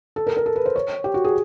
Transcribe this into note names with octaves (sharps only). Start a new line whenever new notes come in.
A4
A#4
A#4
A4
B4
C5
C#5
G4
F#4
G#4